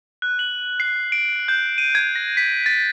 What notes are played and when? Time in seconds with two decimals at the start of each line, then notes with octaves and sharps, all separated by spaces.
0.22 F#6
0.39 F#7
0.80 C7
1.12 D7
1.48 G6
1.78 D#7
1.95 G#6
2.16 A#6
2.37 B6
2.66 A6